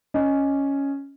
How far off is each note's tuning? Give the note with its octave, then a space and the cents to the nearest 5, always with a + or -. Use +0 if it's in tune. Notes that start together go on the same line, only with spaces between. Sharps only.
C#4 +0 D#5 -10